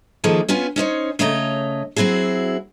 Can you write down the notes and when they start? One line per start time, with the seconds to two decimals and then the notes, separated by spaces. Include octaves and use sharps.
0.24 D#3 F3 A#3 G#4 A4
0.48 B3 C#4 F4 G#5
0.76 C#4 D#4 C5 C#5
1.19 C#3 A3 C#5 D#5 A#5
1.96 F#3 C4 E4 F#4 G#4